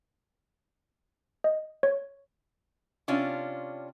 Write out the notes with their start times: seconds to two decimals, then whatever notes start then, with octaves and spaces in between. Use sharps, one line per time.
1.44 D#5
1.83 C#5
3.08 C3 C#4 D4 F4